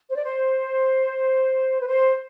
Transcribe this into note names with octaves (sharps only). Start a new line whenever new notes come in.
C5
D5
C5
B4
C5